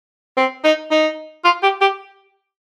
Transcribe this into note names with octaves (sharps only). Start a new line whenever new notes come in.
C4
D#4
D#4
F4
G4
G4